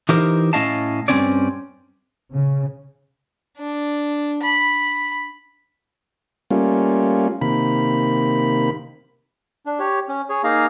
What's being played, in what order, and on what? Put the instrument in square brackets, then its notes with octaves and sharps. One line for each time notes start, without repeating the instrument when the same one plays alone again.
[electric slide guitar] E3 D#4 G4 A#4 C5
A2 C#4 D#5 F5 A5
G2 C3 C4 C#4 C#5 D5
[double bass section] C#3
[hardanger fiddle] D4
B5
[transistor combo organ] G3 A3 A#3 C#4 F4
C3 D#3 A#3 B5
[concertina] D4
G4 C#5
C#4
G#4 C#5
A#3 D#4 G#4 F5 A#5